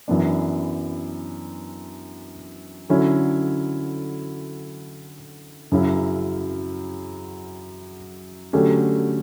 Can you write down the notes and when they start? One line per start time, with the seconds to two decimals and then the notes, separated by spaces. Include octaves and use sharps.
0.08 F#2 E3 B3 D4
2.89 D3 F#3 C#4 E4
5.72 F#2 C#3 F#3 C#4 E4
8.53 D3 F#3 A3 C#4 G4